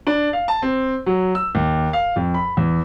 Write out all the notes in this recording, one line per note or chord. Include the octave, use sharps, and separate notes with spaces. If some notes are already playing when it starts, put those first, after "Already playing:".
D4
F5
A5
C4
F#3
E6
D#2
F5
F2
B5
E2